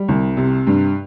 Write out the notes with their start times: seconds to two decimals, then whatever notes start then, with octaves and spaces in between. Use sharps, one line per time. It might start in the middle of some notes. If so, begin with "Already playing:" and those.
Already playing: G3
0.08 C2
0.37 C3
0.67 G2